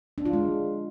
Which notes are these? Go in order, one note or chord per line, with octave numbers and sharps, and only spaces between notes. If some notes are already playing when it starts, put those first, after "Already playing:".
D4
F4
G#3